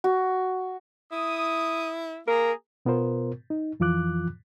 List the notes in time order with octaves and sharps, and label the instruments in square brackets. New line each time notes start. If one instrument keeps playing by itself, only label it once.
[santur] F#4
[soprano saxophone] E4 [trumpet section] D#6
[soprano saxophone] A#3 [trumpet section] G#4 A#5 [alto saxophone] A#4
[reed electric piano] B2 B3 F4 A#4 C5
D#4
F2 E3 F3 F4 D6 F#6